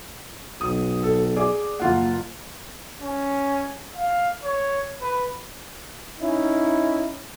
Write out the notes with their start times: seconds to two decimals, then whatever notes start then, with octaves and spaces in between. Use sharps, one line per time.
0.61 B1 D#6
1.03 A4
1.36 G#4 D5 D6
1.80 F#1 A#3 F4 F#5
3.02 C#4
3.96 F5
4.44 C#5
5.02 B4
6.20 C#4 D#4 E4